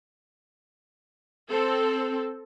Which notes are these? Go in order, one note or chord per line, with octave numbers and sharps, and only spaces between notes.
C4 A4